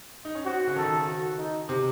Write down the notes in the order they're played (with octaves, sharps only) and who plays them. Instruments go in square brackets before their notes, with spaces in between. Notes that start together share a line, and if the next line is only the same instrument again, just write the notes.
[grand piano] D#4
C#4
[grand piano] C4 [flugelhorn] F#4
[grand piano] C#3
[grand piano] D#3 [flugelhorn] A4
[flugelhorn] F#4
D#4
[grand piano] C3